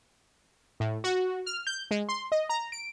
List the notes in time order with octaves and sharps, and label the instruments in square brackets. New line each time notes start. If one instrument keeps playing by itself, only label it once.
[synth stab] A2
F#4
F6
G6
G#3
C6
D#5
A#5
D7